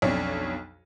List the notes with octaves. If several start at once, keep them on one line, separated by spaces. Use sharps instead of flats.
B1 F2 D4 C#5